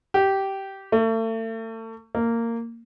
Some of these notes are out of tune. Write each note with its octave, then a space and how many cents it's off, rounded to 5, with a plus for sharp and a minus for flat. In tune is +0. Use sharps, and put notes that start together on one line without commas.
G4 -15
A3 +35
A#3 -15